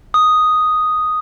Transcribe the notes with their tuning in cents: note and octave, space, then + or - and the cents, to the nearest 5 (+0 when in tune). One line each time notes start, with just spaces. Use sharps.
D#6 +0